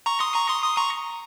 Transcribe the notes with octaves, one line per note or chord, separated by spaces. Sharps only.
A#5 C#6
C6 D#6
A#5 C#6
C6 D#6
C6 D#6
A#5 C#6